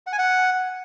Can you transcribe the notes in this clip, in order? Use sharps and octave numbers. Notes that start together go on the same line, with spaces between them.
F#5
G#5
F#5